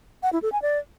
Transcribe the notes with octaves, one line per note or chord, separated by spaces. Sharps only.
F#5
E4
A4
G#5
D5